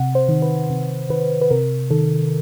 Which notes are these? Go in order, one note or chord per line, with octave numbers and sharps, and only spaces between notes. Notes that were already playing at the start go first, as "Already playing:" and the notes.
Already playing: C3 F#5
C5
D#3
B4
C3
D#3 B4
B4
C3 A#4
D#3 A4